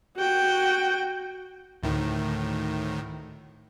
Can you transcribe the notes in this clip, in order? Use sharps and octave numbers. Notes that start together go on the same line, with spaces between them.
F#4 G5
D2 A2 D#3